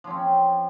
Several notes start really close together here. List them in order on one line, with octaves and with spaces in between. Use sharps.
F3 C#4 C4